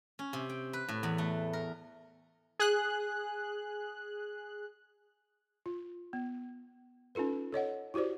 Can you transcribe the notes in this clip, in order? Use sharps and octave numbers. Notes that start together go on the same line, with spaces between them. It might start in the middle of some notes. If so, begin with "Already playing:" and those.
C#4
C3
G5
B4
A2
E2
A3
A#4
G#4 F#6
F4
B3
C#4 D#4 F4 A4 B4
A4 C#5 D#5 F#5
E4 F#4 G4 C5 D5